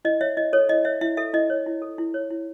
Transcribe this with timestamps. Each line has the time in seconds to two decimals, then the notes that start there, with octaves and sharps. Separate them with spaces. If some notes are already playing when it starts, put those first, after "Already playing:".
0.05 E4 D#5
0.21 C#5 E5
0.37 E4 D#5
0.53 A4 C#5
0.69 E4 D#5
0.85 C#5 E5
1.01 E4 E5
1.17 A4 E5
1.33 E4 D#5
1.50 C#5
1.66 E4
1.82 A4
1.98 E4
2.14 C#5
2.30 E4